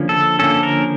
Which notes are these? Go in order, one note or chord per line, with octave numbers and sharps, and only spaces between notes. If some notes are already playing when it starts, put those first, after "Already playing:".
Already playing: D3 F3 A#3 C#4
A4
D3 F3 A#3 C#4 A4
A#4